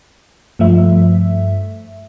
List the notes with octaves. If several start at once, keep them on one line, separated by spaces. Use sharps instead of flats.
G2 F3 A3 E5